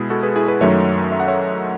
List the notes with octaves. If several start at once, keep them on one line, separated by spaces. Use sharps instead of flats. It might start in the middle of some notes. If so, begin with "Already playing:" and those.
Already playing: B2 G#3 E4 G#4
F#4 A4
G#4 B4
E4 G#4
G#4 B4
F#2 D#3 F#3 A3 C#5 E5
E5
F#5
C#5 E5